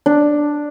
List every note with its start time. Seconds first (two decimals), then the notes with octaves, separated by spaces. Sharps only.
0.06 D4